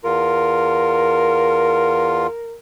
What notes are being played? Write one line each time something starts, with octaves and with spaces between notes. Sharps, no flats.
E2 F4 A#4